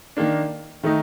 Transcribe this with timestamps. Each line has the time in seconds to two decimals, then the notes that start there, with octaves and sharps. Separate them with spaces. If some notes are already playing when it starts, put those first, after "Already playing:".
0.17 D#3 A#3 D4
0.83 D#3 A3 D#4